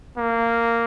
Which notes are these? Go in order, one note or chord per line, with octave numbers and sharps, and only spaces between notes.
A#3